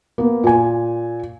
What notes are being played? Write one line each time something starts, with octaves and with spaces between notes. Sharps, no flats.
A#3 B3
A#2 G#5